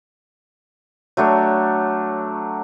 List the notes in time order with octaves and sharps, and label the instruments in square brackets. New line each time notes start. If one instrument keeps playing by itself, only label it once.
[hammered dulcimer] F#3 A3 D4 C#5